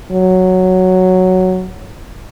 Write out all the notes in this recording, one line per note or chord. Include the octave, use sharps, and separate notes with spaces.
F#3